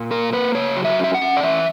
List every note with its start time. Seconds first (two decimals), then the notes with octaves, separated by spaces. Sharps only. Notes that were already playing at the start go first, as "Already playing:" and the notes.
Already playing: A#2
0.11 A#3 A#4
0.33 A#3 B4
0.55 C#3 C#5
0.77 F#3
0.85 E5
1.00 C#4 E5
1.14 F#5
1.22 C#4
1.37 D5
1.43 E3 E5